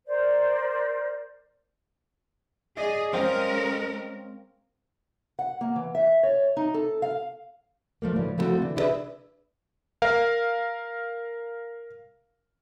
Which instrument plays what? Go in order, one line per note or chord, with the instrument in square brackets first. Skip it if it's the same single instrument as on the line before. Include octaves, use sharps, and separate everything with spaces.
[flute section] A#4 C5 D5
[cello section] G#4 [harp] D5 D#5
[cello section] G#3 C#4 A#4 [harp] C4 F5 G5
[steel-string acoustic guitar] F#5
A#3
E3
E5
C#5
D#4
A4
F5
F3 A3 A#3
A2 D3 E3 F3
F3 A3 B3 C4 F#4 A4
D3 E3
D4 E4 G#4 A4 B4 E5
[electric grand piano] A#4 F5